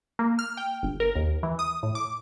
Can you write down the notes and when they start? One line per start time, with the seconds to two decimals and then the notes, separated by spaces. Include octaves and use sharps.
0.19 A#3
0.39 F6
0.57 G5
0.83 G1
1.00 A#4
1.15 D#2
1.43 E3
1.59 D#6
1.83 A2
1.95 D6